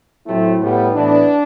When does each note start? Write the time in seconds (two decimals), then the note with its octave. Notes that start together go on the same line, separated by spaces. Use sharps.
0.26 A2 F#3 A3 C4 E4
0.60 A2 G3 B3
0.94 A2 E3 B3 D4